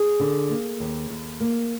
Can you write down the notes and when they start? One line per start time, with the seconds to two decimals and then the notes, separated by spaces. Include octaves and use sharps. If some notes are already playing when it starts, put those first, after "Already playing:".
Already playing: G#4
0.20 D3
0.50 A#3
0.80 D#2
1.10 D#2
1.40 A#3